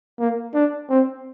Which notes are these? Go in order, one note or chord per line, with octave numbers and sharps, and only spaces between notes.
A#3
D4
C4